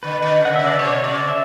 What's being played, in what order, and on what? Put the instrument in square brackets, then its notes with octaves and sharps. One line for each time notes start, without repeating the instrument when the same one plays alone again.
[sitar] D3 [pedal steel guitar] B4
[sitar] D3
[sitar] C#3 [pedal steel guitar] F#5
[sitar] C#3 [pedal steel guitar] E5
[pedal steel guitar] D5
[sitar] B2 [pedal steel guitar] C#5
[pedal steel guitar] C#5
[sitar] C#3 [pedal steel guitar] D5
[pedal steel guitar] E5